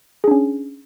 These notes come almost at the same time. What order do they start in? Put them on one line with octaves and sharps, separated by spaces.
G#4 D4 C#4